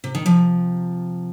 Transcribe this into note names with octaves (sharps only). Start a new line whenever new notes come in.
C3
D#3
C3 F3